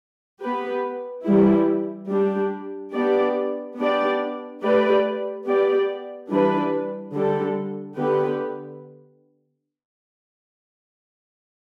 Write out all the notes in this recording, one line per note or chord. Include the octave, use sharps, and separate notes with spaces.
B3 G4 B4
E3 G3 E4
G3 D4 G4
B3 D4 G4 D5
B3 D4 G4 D5
A3 G4 B4 D5
B3 G4 D5
E3 G3 D4 B4
D3 G3 D4 A4
D3 B3 G4 B4